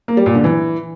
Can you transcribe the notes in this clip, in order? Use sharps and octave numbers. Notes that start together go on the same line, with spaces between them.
A#3
G3
A#2
D3
E3